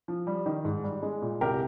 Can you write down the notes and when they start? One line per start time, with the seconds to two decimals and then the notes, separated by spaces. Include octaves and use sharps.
0.08 F3
0.27 G3
0.46 D#3
0.65 G#2
0.84 G3
1.03 G#3
1.22 A#2
1.41 C2 G4 A#4